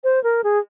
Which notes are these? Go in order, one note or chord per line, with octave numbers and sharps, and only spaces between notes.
C5
A#4
G#4